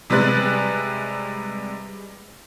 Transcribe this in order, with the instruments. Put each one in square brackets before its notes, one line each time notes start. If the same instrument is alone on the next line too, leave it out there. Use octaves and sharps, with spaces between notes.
[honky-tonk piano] C3 G3 G#3 B4 F#6 A6